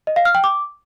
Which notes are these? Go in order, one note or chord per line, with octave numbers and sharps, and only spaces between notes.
D#5
F5
F6
G5
D6